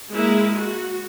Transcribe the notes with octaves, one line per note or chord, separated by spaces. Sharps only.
G#3 A#3 E4
F#4